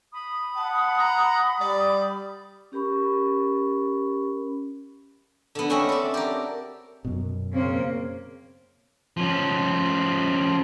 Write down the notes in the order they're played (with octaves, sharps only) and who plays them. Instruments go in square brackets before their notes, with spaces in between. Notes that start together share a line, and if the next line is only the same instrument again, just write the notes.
[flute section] B5 D#6
[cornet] F#5 [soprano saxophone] A5
[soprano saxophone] A#5
[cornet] G3 [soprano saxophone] D5
[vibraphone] C#4 G4 A#4 B5 C#6
[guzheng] D3 B3
C4 C#4 F#4 D#5 E5
A4 D5
G4 A#4
[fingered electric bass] F#2 B2
[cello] C#3 A#3 [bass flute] C4
[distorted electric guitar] F3 C#4